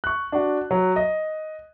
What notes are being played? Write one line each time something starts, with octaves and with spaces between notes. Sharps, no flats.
C#6 F#6
D4 F#4
F#3
D#5